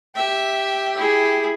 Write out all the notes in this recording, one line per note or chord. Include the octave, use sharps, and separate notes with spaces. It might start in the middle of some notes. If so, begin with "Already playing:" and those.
G4 E5
E4 G#4